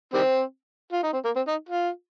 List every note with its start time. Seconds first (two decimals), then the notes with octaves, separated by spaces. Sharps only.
0.14 D#3 G3 C4
0.93 F4
1.03 D#4
1.13 C4
1.25 A#3
1.36 C4
1.48 D#4
1.69 F4